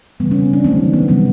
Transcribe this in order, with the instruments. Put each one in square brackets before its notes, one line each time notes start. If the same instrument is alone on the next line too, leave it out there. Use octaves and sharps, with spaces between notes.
[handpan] C#3 E3 G3 B3
C#4
C4
D4
D#3 F#3 A3 C4
C4
B3
C3 E3 G3 B3